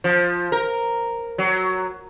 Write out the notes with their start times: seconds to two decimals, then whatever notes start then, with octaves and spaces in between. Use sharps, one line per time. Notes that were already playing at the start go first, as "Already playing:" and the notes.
0.04 F3
0.52 A#4
1.38 F#3